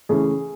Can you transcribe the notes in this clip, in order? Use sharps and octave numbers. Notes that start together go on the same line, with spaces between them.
C#3 E3 A3 C#4 G#4